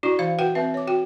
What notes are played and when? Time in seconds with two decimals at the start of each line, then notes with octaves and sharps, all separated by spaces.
0.03 D4 E4 F#4 D5
0.19 E3 C5 F5
0.38 F#4 B4 F#5 G5
0.55 C4 B4 E5
0.74 C#5 D6
0.87 F#4 G5